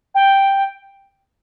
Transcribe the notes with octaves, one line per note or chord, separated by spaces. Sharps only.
G5